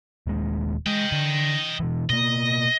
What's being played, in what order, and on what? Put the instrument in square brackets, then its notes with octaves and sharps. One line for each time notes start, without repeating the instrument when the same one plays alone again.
[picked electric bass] D#1 D#2 G#3
[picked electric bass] G#3 [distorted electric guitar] D#5 G5
[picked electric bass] D3
B2 E3
[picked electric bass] B2 A#3 [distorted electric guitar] D#5